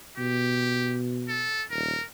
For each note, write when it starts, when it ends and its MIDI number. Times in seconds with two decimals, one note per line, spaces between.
0.18 1.56 47
0.18 0.99 67
1.29 1.64 69
1.71 1.96 27
1.71 2.05 70